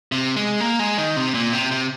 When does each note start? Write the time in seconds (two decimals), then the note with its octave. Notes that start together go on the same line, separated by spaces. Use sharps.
0.12 C3
0.36 G#3
0.60 A#3
0.79 G#3
0.98 D#3
1.16 C3
1.34 A#2
1.53 C3
1.71 C3